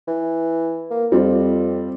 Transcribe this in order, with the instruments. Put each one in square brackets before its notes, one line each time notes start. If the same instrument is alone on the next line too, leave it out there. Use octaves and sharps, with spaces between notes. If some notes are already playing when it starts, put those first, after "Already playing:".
[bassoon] E3
A#3
[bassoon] F2 [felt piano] G3 C4 F4